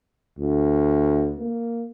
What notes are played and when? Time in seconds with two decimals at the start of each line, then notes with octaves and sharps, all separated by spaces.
0.39 D2
1.38 A#3